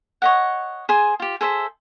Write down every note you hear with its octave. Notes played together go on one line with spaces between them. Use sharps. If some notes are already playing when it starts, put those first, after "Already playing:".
C#5 D#5 F#5
G#4 C5 G#5
F4 G4
G#4 A4 C5 E5